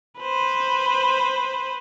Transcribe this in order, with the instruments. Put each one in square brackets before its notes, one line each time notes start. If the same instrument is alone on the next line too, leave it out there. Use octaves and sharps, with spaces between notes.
[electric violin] B4 C5